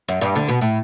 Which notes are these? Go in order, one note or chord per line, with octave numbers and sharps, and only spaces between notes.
F#2
G2
D2 D3
B2
A2